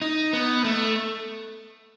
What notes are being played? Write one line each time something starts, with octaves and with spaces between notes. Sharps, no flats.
D#4
B3
A3